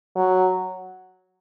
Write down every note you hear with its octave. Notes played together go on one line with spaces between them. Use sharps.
F#3